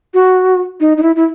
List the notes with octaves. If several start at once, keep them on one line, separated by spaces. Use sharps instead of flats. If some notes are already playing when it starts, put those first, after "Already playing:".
F#4
D#4
D#4
E4
E4